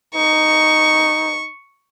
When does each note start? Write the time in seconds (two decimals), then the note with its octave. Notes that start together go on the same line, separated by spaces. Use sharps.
0.15 D#4 C#6